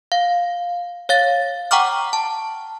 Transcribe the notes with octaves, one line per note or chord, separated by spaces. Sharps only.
F5
C#5 F5 A6
F#5 G5 A#5 C#6 D6 F6
A5